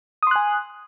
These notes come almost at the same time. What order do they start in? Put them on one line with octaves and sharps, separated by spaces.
D#6 C6 F#6 G#5